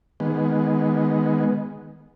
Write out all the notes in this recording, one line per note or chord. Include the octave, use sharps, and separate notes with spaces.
D#3 G#3 B3